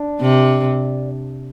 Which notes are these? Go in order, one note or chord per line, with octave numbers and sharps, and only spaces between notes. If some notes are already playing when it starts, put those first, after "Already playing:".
Already playing: D4
C3